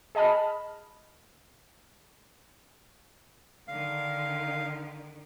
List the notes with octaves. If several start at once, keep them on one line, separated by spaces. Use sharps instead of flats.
G#4 D#5 A5 B5 F6
D3 D#3 F5